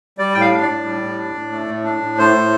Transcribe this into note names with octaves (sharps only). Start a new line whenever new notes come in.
G3 D5
A2 G5
F5
D4
D5
A2
G3
A2
D4
A2
A3
A2
D4
A2
A3 C5
A2